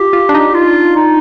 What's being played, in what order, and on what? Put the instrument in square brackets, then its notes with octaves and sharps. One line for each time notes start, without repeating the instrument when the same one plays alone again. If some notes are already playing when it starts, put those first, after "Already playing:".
Already playing: [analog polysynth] F4 [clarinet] G4
[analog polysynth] F4
D4
D#4
[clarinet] F4
D#4